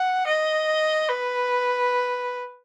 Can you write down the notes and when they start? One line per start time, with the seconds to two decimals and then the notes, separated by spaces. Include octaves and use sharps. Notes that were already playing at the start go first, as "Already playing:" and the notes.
Already playing: F#5
0.26 D#5
1.09 B4